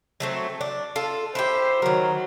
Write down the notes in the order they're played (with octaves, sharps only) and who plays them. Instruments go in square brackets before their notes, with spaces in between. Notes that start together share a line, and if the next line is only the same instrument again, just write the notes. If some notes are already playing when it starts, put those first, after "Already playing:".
[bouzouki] F#3 A3 C4
D4
F4 A4
[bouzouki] E4 F4 G4 [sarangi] C5
[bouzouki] D#3 A#4 [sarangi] F#3